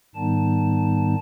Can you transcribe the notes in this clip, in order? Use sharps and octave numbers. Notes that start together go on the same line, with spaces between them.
G#2 D#3 G3 B3 D#4 A5